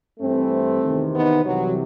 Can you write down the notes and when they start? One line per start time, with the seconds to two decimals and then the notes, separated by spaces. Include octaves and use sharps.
0.20 G2 E3 A3 C4
0.83 E2 C3 D#3
1.14 B3 D#4
1.44 C2 C3 E3 F#3